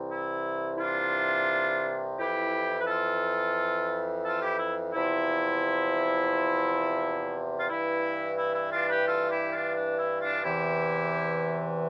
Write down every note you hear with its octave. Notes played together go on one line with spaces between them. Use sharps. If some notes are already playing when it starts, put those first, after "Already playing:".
Already playing: C2 C3 E3
E4
E4
D4 F4
F2 E3 E4 G4
B4
F4 A4
F4 A4
E4 G4
E4
E2 C3 F3 E4
F4
G2 E3 E4
E4
E4
D4 F4
G4 B4
F4 A4
E4 G4
D4 F4
D4
E4
D4 F4
E2 C3 E3 E4 G4